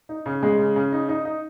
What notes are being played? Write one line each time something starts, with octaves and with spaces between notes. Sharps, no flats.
D#4
C#3
G#3
C#3
C#3
D#4
D#4
D#4